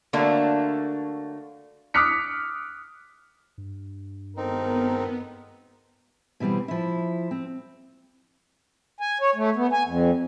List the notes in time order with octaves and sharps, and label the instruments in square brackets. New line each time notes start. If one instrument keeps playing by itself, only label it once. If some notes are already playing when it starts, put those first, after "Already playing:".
[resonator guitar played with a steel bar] D3 F#3 A3 A#3 D4
[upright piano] D6 D#6 F6 F#6 B6 C#7
[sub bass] G2
[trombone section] G#1 A4 A#4 [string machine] B3 [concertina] C4 D#4
[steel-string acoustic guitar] B2 E3 G3 C4
F3 E4
C4
[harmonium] G#5
C#5
A3
B3
G#5
F2